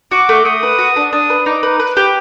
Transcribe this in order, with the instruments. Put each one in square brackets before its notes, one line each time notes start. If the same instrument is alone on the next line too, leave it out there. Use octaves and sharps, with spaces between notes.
[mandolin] F#4 [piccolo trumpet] D6
[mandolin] A3
[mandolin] A3 [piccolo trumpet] D#6
[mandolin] B4
F#4
D4
[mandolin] D4 [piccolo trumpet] D#6
[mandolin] B4
[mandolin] D#4 [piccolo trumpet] D6
[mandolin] B4
B4
G4